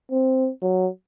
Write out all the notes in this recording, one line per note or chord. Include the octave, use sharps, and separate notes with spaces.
C4
F#3